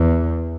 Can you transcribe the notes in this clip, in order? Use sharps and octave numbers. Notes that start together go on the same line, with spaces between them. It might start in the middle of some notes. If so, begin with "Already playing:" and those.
Already playing: E2